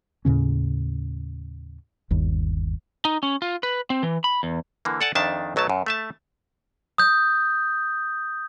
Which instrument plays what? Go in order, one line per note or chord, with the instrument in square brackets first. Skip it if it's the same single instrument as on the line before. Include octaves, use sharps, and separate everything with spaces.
[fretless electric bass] D#2 A2 C#3 C#4
G1 D#2
[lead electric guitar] D#4
C#4
F4
B4
C4
E3
B5
E2
[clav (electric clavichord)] D3 E3 A#3
A4 D5 F#5 G#5 A5
F2 D#3 D4 E5 A5
B1 F#3 A3 A5
F#2
A3 E5 A5
[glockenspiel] D#6 G6